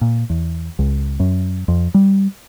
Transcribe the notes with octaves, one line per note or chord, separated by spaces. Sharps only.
A#2
E2
C#2
F#2
F2
G3